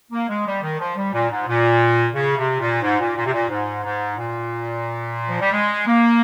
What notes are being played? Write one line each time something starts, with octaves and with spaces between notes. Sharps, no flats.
A#3
G#3
G3
D#3
F3
G3
A#2
G#2
A#2
C#3
C3
A#2
G#2
A#2
A#2
C3
A#2
G#2
G#2
A#2
F3
G3
G#3
A#3